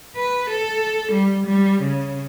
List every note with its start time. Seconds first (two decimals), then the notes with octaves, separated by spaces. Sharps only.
0.16 B4
0.49 A4
1.12 G3
1.46 G3
1.82 C#3